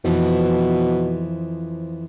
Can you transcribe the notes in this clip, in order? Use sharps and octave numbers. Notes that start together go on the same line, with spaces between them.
F2 B2 E3 F3